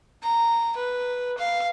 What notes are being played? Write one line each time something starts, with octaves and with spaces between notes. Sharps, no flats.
A#5
B4
F5